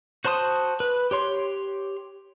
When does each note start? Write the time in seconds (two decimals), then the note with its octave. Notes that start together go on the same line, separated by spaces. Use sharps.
0.25 F#4 C5 A5 C6 D#6
0.80 B4
1.11 G4 C#5 C6